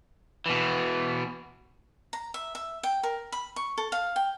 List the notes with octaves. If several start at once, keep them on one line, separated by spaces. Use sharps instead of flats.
B2 E3
A#5
E5
E5
G5
A#4
B5
C#6
A4
F5
G5